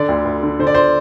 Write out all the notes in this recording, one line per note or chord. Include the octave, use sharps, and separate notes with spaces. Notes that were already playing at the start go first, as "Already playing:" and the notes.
Already playing: D3 D5
D2
D2
D3
D3 C5
D5
C5